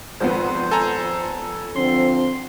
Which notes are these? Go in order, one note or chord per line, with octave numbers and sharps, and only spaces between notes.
G#1 F2 B3 C5
A4 G#5 A#5
D3 F3 C4 C6